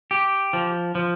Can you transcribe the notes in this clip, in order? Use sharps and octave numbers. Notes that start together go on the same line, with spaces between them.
G4
F3
F3